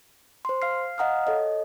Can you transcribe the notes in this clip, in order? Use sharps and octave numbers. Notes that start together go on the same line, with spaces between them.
C5 C6
F5 F6 C7
D#5 F5 F#5 A#5 D#6 F6
A4 C#5 D#5